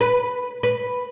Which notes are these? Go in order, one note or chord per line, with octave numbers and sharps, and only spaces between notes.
B4
B4